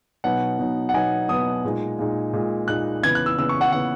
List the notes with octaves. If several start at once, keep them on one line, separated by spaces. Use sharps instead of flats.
B2 F#3 B3 D#4 F#5
B2 F#3 B3 D#4
F#5
B2 F#3 B3 D#4 G#5
B2 F#3 B3 D#4 D#6
A#2 G#3 D#4
A#2 G#3 D#4
A#2 G#3 D#4
A#2 G#3 D#4 F#6
C#3 E3 B3 G#6
F#6
E6
C#3 E3 B3 E6
C#6
F#5
C#3 E3 B3 F#5